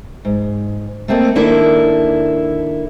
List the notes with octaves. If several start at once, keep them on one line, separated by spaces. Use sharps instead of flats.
G#2
A3 A#3 C4 A4 D#5
D#3 A#3 D4 E4 A4